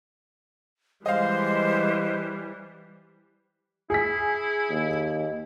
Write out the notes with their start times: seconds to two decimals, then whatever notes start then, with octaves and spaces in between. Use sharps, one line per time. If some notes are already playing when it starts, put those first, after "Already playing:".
1.06 E3 G3 G#3 C5 D#5 F5
3.90 E4 G#4 B6
4.70 D#2